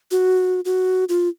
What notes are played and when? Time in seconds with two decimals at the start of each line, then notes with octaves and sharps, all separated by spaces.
0.11 F#4
0.65 F#4
1.09 F4